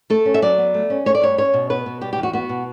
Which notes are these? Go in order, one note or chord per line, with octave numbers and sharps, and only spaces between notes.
A3 A4
C#4
E5
F#3 D5
B3
A3
C#4
A3 C#5
D5
G2 C#5
C#4 C#5
B2
B3 B4
B2
G3 G4
G4
E2
F#4
B3 F#4
B2